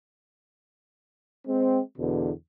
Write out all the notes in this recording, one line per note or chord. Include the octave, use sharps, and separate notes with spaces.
G#3 C4
E2 B2 D3